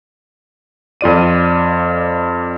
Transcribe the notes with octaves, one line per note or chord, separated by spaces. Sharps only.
F2 F4 D5 D#7